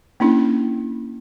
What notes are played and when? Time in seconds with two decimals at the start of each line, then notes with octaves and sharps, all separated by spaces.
0.20 A#3 C#4 D4 E4